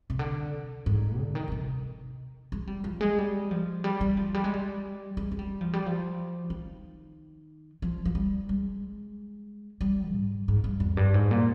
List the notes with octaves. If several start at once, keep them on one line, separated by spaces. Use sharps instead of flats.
C3
D3
G#2
D3
D#3
D3
C3
G#3
G3
F3
G#3
G3
F3
G3
G3
F3
G3
G#3
G3
G#3
G#3
G3
F3
G3
F3
D#3
F3
F3
G3
G#3
G3
G#2
G#2
G2
F2
G2
G#2
A#2